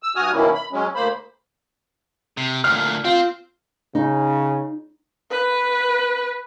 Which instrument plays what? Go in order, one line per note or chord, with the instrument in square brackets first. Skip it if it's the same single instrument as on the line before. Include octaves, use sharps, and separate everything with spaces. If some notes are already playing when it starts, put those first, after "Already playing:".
[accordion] E6
G2 F#4 G#5 D#6 F6
B2 D#3 A#3 C#4 E4
B5
F#3 G#3 C#4
D2 A#3 C5 B5
[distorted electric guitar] C3
[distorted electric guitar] D2 A#2 [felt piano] F6
[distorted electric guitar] C4 [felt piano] F4
[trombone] C#3 [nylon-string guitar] D#4
[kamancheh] B4